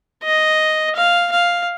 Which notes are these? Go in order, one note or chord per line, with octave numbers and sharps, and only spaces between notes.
D#5
F5
F5